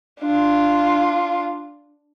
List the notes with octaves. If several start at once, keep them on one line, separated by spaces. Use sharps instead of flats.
D4 F4